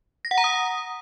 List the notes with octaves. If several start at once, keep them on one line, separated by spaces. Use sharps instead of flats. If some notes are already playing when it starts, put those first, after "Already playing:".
A#6
F#5
A#5
D#6